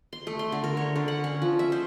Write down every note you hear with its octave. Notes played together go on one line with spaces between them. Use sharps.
C6
A3
C6
D3
A#4
C#5
D3
F#5
C#4
F3
E5
C5